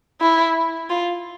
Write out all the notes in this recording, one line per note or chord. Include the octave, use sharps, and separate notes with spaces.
E4
F4